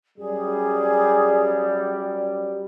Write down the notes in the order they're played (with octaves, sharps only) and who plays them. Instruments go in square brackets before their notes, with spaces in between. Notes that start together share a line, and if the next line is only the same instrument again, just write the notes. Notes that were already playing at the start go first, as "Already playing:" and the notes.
[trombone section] F#2 G3 [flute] G#4